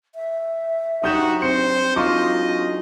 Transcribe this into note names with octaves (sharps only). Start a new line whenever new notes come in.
E5
F#2 D4 D#4 F#4 G4 D#6 G6 E7
C4 C5 C#7
F#3 D4 D#4 F4 D#5 C#6 D6